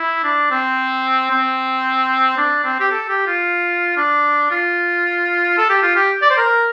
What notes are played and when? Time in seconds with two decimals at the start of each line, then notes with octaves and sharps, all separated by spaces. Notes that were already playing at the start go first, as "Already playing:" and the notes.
Already playing: E4
0.24 D4
0.51 C4
1.31 C4
2.37 D4
2.64 C4
2.80 G4
2.91 A4
3.09 G4
3.27 F4
3.97 D4
4.51 F4
5.58 A4
5.70 G4
5.83 F4
5.95 G4
6.22 D5
6.30 C5
6.37 A#4